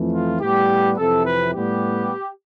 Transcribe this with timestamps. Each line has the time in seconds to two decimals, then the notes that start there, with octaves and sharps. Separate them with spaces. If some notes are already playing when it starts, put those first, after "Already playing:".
Already playing: F2 E3 A3
0.13 F4
0.41 A2 G3 B3 G4
0.98 F2 C3 E3 A4
1.26 B4
1.54 A2 G3 B3 G4